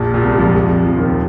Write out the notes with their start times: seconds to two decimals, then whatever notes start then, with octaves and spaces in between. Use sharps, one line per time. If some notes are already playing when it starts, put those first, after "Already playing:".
Already playing: A#1 A#2
0.14 A#2
0.23 C2 C3
0.34 G#3
0.38 F2 F3
0.86 F2 F3
0.96 D#2 D#3
1.07 C3